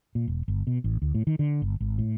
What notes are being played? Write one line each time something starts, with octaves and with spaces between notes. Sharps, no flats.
A#2
E1
G1
B2
A1
D2
A2
D#3
D3
G1
G#1
A2